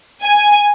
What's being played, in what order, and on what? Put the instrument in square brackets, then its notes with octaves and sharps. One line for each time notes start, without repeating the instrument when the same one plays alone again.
[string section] G#5